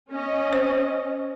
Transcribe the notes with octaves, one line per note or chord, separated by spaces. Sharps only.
C#4 D#5
C5